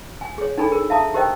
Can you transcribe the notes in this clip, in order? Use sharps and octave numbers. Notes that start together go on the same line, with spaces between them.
G#5
G#4 C#5
D4 D#4 A4 G#5 B5
G#4 A#4
E5 F5 A5 A#5 D#6
G4 A#4 C5 D#5 G5